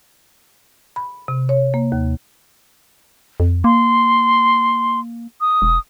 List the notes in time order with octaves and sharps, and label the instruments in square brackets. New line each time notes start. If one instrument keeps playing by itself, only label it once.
[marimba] B5
C3
C#5
A#3
D#2
[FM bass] F2
[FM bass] A#3 [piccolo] C6
[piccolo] D#6
[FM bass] E1